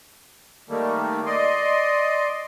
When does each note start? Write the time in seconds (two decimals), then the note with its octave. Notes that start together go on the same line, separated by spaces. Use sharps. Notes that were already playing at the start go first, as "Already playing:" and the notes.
0.69 D#3 G3 A3 A#3
1.26 D5 D#5 C6